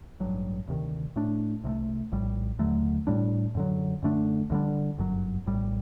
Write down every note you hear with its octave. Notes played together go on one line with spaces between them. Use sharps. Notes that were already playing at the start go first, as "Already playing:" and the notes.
A1 G2 F#3
D2 C3 D#3
A2 A3 D4
C2 C3 F#3 A3
A#1 A2 G3
D#2 D3 F#3 A3
A2 G3 D4
F#2 D3 F#3
F#2 D3 A3 D4
D2 D3 G3 D4
G1 F#2 F#3
A#1 A2 G3